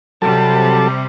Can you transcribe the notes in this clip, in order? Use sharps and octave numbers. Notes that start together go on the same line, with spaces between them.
C3 F#3 G3 A4 A5